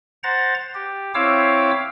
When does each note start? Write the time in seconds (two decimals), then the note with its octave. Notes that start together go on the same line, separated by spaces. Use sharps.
0.24 C5 F#5 A#5 A6
0.75 G4
1.15 C4 E4 C#5 F5 D6 E6